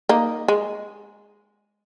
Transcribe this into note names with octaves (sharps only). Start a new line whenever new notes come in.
A#3 D#4
G#3